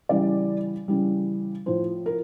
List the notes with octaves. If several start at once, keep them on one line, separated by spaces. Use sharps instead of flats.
C#3 E3 G3 D5
C#3 E3 G3
A2 F3 C5
A#4